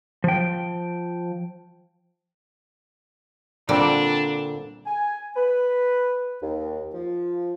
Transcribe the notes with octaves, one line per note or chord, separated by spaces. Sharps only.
F3 G5
A#2 D3 G3 A#3 C4 D4
G#5
B4
D#2
F3